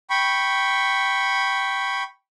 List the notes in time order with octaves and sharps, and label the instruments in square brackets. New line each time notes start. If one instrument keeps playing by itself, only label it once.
[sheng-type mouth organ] G5 B5 C#6